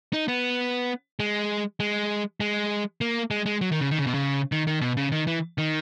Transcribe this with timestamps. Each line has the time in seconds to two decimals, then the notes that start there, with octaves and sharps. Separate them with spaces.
0.13 D#4
0.28 B3
1.20 G#3
1.80 G#3
2.40 G#3
3.01 A#3
3.31 G#3
3.46 G#3
3.61 F#3
3.72 D#3
3.81 C#3
3.91 D#3
3.99 C#3
4.07 B2
4.14 C#3
4.52 D#3
4.67 D#3
4.81 B2
4.97 C#3
5.12 D#3
5.27 E3
5.58 D#3